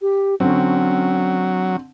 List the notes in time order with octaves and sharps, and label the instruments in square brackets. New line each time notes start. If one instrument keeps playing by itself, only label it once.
[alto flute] G4
[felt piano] D3 C4 [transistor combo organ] F#3 [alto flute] C#4